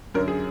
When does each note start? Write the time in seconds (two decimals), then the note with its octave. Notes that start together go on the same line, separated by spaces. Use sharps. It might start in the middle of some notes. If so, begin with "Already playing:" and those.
0.14 F#2 D3 F#3 A#4
0.28 G#4